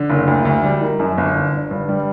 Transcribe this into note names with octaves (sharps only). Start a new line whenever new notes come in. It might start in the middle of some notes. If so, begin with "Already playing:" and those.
Already playing: D3
F#1
D2
D2
G3
D#3
F#2
G1
D3
D3
G2
G3